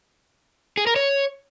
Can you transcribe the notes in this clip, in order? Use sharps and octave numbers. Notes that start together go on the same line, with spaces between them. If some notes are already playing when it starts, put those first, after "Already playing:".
G#4
A#4
C#5